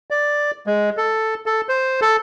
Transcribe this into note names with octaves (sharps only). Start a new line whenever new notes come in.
D5
G#3
A4
A4
C5
A4